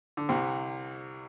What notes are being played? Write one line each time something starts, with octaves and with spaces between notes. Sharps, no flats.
D3
C2 C3